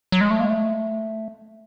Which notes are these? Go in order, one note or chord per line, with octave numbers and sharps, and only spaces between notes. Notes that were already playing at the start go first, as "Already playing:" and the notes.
F#3
G#3
A3
A#3
G#3
A3